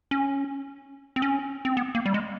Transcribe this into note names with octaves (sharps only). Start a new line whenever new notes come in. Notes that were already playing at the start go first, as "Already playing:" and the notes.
C#4
C4
C#4
C4
B3
A#3
G3
G#3